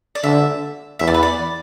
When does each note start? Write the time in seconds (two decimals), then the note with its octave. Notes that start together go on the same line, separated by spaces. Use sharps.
0.15 D5
0.23 D3 E5
0.99 E2 E5
1.08 D5
1.14 B4
1.23 D5